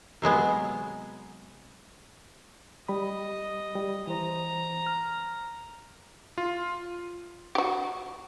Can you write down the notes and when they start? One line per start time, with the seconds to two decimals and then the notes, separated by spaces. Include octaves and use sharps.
0.22 C3 F#3 G#3 B3
2.88 G3 D#5 B5
3.75 G3
4.07 E3 C5 A#5
4.87 F6
6.38 F4
7.55 F#4 G4